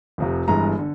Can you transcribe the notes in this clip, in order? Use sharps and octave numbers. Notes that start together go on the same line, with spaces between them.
F1 F2 C3
G1 G2 E3 G#3 A#5
D3